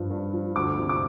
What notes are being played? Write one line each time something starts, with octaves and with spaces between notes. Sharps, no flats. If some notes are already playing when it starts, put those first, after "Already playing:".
Already playing: G2 F3
G2
F3
D2 D6
C3 F3
D6